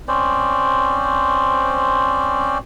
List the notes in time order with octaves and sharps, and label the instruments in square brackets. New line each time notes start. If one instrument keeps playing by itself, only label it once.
[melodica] C4 C#4 C5 D5